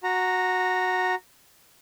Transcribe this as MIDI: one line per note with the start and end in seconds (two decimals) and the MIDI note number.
0.03 1.15 66
0.03 1.15 82